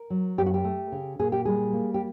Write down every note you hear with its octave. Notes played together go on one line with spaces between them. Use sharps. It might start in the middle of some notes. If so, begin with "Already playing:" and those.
Already playing: A#4
F#3
F#2 G4
F#4
G4
A3
C#3
A#2 G#4
G4
G3 G#4
A#3
G4